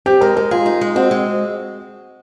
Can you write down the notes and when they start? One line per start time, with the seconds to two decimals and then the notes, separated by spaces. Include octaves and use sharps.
0.06 C4 G4
0.21 G#3 A#4
0.36 G#3 A#4
0.51 F4 G#4
0.66 D#4
0.81 G#3
0.96 C4 F#4
1.11 G#3